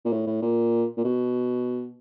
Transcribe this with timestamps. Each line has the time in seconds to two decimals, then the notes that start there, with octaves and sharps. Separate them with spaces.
0.05 A#2
0.12 A2
0.27 A2
0.42 A#2
0.97 A#2
1.04 B2